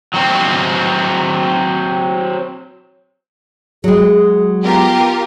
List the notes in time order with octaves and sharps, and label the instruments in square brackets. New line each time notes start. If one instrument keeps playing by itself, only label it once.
[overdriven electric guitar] F#3 C4
[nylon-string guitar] F#3 G#3 [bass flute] G#4
[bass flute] B3 [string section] F4 G4 A#4